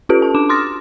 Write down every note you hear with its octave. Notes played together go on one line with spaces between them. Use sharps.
C#4 F4 G4 A4 B4 D7
A5
D4 D6 E7
C6 D6 D#6 F6 A6 A#6